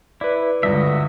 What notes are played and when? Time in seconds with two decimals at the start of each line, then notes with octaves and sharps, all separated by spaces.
0.21 E4 B4 D5
0.63 C#2 G2 D3 F#4 D#5 E5